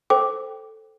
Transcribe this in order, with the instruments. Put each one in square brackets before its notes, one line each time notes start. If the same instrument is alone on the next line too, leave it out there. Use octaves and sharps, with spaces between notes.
[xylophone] A4 C5 G5 D6